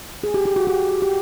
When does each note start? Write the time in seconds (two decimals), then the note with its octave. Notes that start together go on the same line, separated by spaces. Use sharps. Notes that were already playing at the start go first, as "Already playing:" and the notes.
0.24 G#4
0.34 G4
0.45 G4
0.56 F#4
0.67 G4
1.02 G4